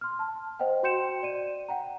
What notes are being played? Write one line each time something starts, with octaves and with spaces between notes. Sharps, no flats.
C6 F6
A5
C5 D#5 F#5 G5
F#4 G5 C6 G6 C#7 E7
D5 D#7
F#5 G5 A#5